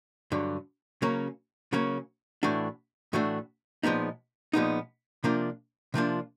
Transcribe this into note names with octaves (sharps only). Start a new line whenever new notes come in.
G2 D3 F#3
C#3 F#3 A#3 C#4
C#3 F#3 A#3 C#4
A2 E3 A3 D4 F#4
A2 E3 A3 D4 F#4
A#2 F3 G#3 B3 D#4
A#2 F3 G#3 B3 D#4
C3 F3 A#3 D4 F4
C3 F3 A#3 D4 F4